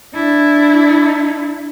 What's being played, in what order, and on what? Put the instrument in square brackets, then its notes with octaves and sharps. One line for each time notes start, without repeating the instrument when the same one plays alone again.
[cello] D4 E4